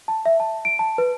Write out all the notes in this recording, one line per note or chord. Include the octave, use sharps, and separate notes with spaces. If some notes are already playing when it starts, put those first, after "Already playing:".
A5
E5
A5
D7
A5
B4